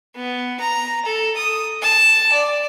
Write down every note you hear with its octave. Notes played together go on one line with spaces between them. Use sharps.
B3
A#5
A4
D#6
A5
D5